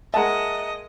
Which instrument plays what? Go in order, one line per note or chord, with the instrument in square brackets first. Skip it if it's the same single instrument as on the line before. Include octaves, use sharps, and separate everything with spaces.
[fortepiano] G#3 A#3 [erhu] D#5 [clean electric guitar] E5 A#5 [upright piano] F#5 A5